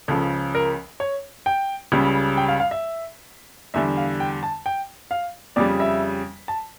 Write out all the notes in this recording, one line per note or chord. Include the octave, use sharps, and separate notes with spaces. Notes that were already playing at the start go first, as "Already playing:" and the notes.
C#2 C#3 F3 A4
A#4
C#5
G5
C#2 C#3 G3
G5
F5
F5
E5
E2 D3 G3 E5
F5
G5
A5
G5
F5
F2 C#3 G3 D5
E5
A5